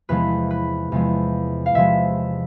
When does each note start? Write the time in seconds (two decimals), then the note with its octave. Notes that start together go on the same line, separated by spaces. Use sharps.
0.09 E2 C3 F3 G#3 B4
0.51 B4
0.92 E2 C3 F3 G#3
1.66 F5
1.74 E2 C3 F3 G#3 E5